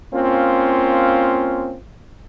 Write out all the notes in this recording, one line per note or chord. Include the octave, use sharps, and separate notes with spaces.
A#3 C4 C#4 F4